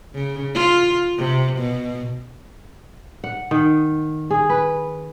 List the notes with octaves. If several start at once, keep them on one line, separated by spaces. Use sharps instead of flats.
C#3
F4
C3
B2
F#5
D#3
G#4
B4